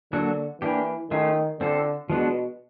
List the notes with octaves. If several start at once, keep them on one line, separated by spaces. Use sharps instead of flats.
D3 F#3 A#3 D4 F#4 A4
E3 A#3 D4 G4
D#3 A3 C#4 F4
D3 C4 F4 A4
B2 F3 G#3 B3 D4 F#4